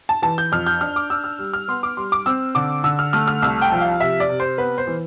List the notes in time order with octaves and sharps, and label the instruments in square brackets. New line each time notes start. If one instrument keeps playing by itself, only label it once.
[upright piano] A5
E3 A5
G6
F2 F6
G6
D4 F6
D6
D4 E6
F6
G3
F6
B3 C6
D6
G3 C6
D6
C4 E6
D3 D6
D3 E6
F6
A3 F6
F6
C2 E6
G5
F3
F5
C3 E5
D5
C3
C5
B3 B4
C5
E3